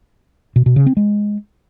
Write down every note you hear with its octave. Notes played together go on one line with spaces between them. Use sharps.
B2
B2
C#3
C4
G#3